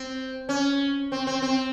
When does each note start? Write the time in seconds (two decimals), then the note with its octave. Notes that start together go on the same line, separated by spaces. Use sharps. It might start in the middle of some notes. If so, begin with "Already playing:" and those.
Already playing: C4
0.49 C#4
1.12 C4
1.27 C4
1.42 C4